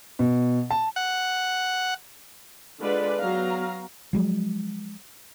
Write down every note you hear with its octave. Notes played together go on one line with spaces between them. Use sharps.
B2
A5
F#5
D3 G#3 F4 B4 D5
F#3 B3 F5 A#5
F3 F#3 G#3